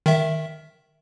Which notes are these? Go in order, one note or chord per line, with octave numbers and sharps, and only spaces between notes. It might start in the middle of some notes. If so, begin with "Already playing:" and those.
D#3 E5